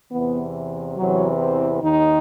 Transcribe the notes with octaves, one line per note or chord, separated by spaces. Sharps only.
E2 C3 E3 B3
E2 C3 E3 F#3
C4
D#2 D#3 D#4